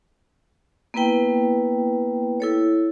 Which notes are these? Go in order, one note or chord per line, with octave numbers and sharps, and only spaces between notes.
A#3 B3 E4 B4 G5
E4 A4 C#5